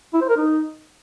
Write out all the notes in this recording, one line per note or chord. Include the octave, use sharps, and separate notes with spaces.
E4
C5
A#4
D#4